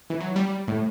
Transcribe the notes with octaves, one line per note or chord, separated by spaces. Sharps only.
E3
F#3
G3
A2